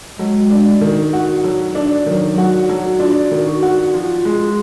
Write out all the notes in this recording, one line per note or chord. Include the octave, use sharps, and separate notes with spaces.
F#3 G#3
D4
D#3
F#4
F#3
D4
D#3 F#3
F#4
F#3
D4 F4
D#3
F#4
F#4
F3 F4
G#3